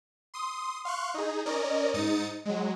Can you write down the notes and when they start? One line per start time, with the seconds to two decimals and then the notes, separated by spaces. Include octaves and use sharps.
0.34 C6 D#6
0.85 F5 C6 C#6 F#6
1.14 D#4 G#4
1.46 C#4 A#4 D5 D#5
1.93 G#2 D#4 D#6 A6 C#7
2.45 F#3 G#3